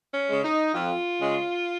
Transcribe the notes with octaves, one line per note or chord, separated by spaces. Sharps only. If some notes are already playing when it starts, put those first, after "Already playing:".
C#4
C#3 G#3
D#4
F2 F4
C#3 G#3